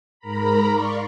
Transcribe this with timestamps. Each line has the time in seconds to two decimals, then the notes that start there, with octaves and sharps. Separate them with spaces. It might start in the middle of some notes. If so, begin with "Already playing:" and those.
0.20 G#2 A#4 A#5 B5
0.71 D5 F5 C6 C#6